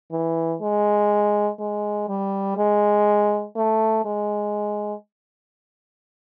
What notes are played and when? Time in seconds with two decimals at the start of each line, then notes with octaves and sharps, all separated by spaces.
0.11 E3
0.61 G#3
1.60 G#3
2.09 G3
2.58 G#3
3.56 A3
4.05 G#3